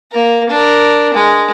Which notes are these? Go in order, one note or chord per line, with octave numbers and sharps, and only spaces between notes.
A#3 A#4
D4 A#4
G#3